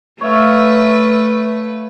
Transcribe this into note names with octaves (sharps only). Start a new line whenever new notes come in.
A3 B4 C#5 E5 F5